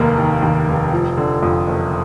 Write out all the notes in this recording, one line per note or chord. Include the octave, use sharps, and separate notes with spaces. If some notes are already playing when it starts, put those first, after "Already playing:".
Already playing: F1 D#2 D#3 A#3
D#3
D#2
F1
F3
D3
F2
F#1